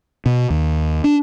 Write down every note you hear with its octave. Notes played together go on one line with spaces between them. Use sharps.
B2
D#2
D4